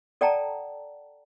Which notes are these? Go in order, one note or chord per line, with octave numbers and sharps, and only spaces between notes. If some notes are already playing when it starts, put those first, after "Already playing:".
A4 D5 F#5 G5 A5 A#5